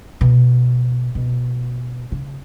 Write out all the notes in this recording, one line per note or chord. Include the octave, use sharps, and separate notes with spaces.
B2
B2
C#3